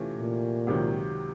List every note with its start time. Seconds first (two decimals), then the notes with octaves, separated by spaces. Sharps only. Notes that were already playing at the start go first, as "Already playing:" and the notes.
Already playing: C3 E3 A3 C#4 F4
0.17 A#2
0.67 C#2 C3 D#3 F#3